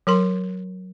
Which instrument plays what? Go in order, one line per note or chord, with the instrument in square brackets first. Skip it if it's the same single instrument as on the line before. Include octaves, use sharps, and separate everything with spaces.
[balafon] F#3 A#4 C6